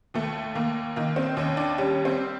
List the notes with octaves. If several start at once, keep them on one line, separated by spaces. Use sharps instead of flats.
D#2 A3
D#2 A#3
D#3 A#3
C4
D#2 C#4
D4
G3 C#4
C4